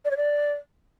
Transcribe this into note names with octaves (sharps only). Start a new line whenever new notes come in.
D5
C#5
D5